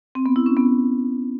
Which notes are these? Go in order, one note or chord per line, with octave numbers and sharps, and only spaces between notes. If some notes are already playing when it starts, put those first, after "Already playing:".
C4
B3
E4
C#4
B3